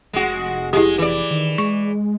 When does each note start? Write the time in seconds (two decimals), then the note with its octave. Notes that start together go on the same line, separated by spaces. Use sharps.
0.13 F1 G#3 F#4
0.73 G#3 E4 G4
0.98 E3 D5
1.31 D#3
1.58 G#3 C#6